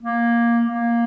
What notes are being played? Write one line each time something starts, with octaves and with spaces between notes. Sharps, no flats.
A#3
A#3